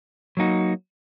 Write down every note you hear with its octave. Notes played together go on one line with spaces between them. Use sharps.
F#3 A#3 D#4 F#4